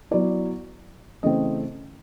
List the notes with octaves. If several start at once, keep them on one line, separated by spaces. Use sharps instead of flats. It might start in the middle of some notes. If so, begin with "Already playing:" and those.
F#3 B3 E4 D5
C#3 E3 A3 C4 D#5